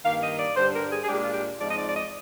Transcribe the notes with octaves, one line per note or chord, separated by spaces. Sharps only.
G2 D#3 A#3 F5
D#5
D5
G2 D3 G3 C5
A#4
G#4
G#4
A#2 G#3 D4 G4
F4
G4
G#2 F3 G#3 C4 D#4 D5
D#5
D5
D5
D#5